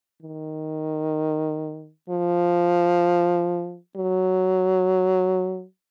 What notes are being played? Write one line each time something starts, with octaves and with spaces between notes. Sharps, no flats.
D#3
F3
F#3